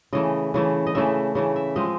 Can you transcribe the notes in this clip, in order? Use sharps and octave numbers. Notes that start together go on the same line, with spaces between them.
C#3 E3 A3 D#5
C#3 E3 A3
D#5
C#3 E3 A3 E5
C#3 E3 A3
E5
F3 G#3 C4 D#5